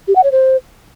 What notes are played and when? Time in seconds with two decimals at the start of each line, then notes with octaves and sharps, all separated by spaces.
0.08 G4
0.16 F#5
0.24 C#5
0.32 C5